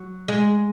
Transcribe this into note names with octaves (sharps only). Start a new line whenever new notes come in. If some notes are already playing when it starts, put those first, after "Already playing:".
Already playing: F#3
G#3